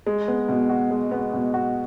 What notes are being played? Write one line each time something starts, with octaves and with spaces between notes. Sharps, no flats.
G#3
B3
B2
F#4
G#3
B3
B2
F#4